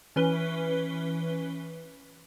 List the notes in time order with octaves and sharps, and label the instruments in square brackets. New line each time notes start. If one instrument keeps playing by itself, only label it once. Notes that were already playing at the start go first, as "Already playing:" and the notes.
[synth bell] E3 C#4 B4 G7